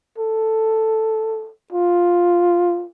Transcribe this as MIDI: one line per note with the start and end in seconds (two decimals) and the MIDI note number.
0.18 1.51 69
1.73 2.86 65